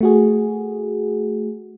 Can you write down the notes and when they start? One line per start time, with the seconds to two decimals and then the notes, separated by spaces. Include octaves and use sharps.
0.01 A3 F#4 G#4